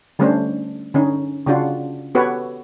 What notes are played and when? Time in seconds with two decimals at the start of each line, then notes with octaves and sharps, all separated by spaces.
0.19 D3 G3 A3 C#4 D4 C5
0.94 D3 C#4 D#4
1.46 C#3 C#4 D4 F4 F#4
2.15 B3 F#4 G4 A4 B4 C#5